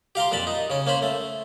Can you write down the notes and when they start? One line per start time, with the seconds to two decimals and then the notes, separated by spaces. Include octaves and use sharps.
0.15 G4 F5 A#5 C6
0.32 F2 A#2 A5 B5
0.47 D#4
0.70 C#3 C#4
0.87 A#3 C#4 C5 B5
1.02 A3